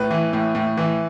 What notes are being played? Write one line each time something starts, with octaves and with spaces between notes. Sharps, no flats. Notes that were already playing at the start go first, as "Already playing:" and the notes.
Already playing: A2 B4
E3
A2
A2
E3